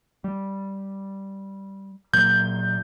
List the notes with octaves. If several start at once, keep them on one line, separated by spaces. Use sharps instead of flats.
G3
A#2 F#3 A#3 G6